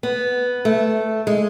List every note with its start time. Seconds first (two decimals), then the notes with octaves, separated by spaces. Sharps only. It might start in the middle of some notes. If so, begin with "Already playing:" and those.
0.03 B3
0.65 A3
1.27 G#3